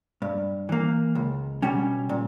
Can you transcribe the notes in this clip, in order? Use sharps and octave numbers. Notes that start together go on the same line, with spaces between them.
G2
E3 A#3
C#2
B2 G3 C#4
A#2